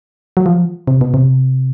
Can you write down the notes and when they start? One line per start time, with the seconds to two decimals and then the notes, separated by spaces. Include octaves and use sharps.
0.37 F#3
0.46 F3
0.87 C3
1.01 B2
1.14 C3